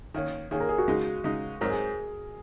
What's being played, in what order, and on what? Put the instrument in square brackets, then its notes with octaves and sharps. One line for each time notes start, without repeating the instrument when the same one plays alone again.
[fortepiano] D#3 A#3 C#4
[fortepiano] D#3 A#3 C#4 [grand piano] G#4
[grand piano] A#4
G#4
F#4
[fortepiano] C#3 G#3 D#4
C#3 G#3 D#4
[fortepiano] G#2 F#3 C4 [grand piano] A#4
[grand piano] G#4